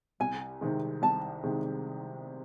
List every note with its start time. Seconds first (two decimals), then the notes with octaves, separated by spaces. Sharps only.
0.20 C2 G#5
0.61 C3 D#3 G#3
1.02 C2 A5
1.43 C3 D#3 G#3